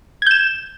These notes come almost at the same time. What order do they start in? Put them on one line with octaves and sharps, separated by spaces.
G#6 G6 E7